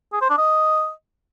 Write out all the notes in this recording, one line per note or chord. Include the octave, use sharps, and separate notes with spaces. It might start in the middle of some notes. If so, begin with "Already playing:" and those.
G#4
C5
D4
D#5